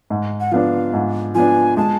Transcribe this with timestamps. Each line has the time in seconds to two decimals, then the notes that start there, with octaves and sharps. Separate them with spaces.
0.10 G#2
0.40 F#5
0.51 F3 B3 D4 F5
0.93 G#2
1.35 F3 B3 D4 G#5
1.77 G#3 A5